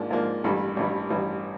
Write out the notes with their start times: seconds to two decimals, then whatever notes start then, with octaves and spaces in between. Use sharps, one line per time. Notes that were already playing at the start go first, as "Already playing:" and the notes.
Already playing: G#2 F3 A#3 D4
0.11 G#2 F3 A#3 D4
0.44 A1 G2 E3 A4
0.76 A1 G2 E3
1.10 A1 G2 E3